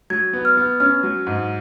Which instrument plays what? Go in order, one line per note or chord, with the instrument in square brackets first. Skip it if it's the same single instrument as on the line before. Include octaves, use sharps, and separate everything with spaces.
[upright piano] F#3 [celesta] G#6
[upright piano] B3
[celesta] F6
[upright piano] B3
[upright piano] C#4 [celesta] F6
[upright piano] F#3
G#2